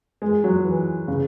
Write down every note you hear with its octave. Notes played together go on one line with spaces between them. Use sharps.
G#3
F#3
E3
C#3